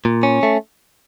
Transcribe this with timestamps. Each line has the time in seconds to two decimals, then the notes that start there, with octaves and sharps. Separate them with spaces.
0.05 A#2
0.23 C#4
0.43 A3